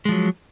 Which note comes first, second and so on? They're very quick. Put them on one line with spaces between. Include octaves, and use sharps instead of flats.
G#3 F3 F#3